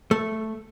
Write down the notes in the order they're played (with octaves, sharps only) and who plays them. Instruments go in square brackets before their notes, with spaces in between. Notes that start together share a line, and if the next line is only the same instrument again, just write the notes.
[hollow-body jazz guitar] A3